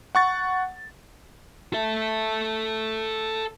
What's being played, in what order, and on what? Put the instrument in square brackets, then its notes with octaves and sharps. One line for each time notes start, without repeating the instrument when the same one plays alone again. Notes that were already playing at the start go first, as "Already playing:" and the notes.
[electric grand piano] F#5 C#6 A6
[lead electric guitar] A4 E5